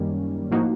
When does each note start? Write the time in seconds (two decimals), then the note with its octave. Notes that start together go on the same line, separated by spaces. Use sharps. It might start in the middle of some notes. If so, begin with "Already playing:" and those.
Already playing: F#2 D#3 G3 A#3 C#4
0.51 A2 F3 A#3 D#4 F#4